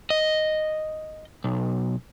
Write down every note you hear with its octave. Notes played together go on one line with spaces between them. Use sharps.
D#5
B1